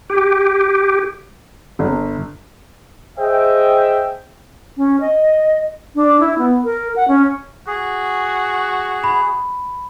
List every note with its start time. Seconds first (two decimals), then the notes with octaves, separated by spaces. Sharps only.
0.10 G4
1.79 G1
3.19 G#4 C5 D#5 E5 G5
4.77 C#4
5.01 D#5
5.95 D4
6.20 E4
6.38 B3
6.64 A#4
6.96 F#5
7.08 C#4
7.67 F#4 G#4
9.04 B5